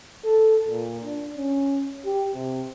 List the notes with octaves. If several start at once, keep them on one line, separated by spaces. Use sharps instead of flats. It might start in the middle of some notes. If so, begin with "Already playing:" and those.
A4
A#2
D4
C#4
G4
C3